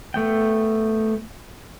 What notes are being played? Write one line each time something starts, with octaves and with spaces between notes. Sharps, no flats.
A3 B3 G5